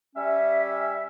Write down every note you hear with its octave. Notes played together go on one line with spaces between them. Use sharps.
G3 C#4 E5